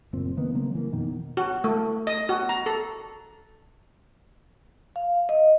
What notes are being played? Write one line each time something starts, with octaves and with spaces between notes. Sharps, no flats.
F#1 A#2 C4
D#3 A#3 B3
C#3 F#3 A#3 C4
E3 A#3
F2 B2 D#3
F#4
A3
D#5
F#4
A#5
A4
F5
D#5